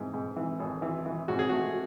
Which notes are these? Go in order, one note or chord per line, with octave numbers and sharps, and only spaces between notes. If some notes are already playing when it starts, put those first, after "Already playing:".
Already playing: G#2 E3
G#2
E3
G#1
E3
E3
G#2 F#4
G#4
A3 F#4